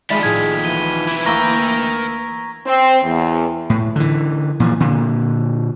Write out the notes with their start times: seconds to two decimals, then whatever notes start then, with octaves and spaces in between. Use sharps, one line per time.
0.10 D#3 F3 G#3 D5 E5 B5 B6
0.23 A#1 A2 G#4 G#6
0.64 E3 D#7 G7
1.08 C3 E4
1.26 D2 A#3 A#4 G5 A#5 C#6 E6 A#6
2.66 C4
3.03 E2
3.70 A2
3.96 D3 E3
4.60 A#2 E3 F3
4.80 A#2 D3